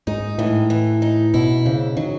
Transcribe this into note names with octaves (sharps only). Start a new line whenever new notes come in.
G#2 D#4
A2 E3
E3
D#4
B2 E4
G#2 C#3
D#3 F#3